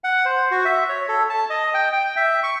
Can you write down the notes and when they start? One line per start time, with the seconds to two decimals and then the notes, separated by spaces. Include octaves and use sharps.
0.04 F#5
0.25 C5
0.51 F#4
0.65 E5
0.89 C#5
1.09 A4
1.30 A5
1.50 D#5
1.74 G5
1.92 G5
2.16 E5
2.43 C#6